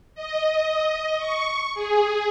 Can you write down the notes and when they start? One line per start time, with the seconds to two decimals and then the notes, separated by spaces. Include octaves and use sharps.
0.15 D#5
1.17 C#6
1.74 G#4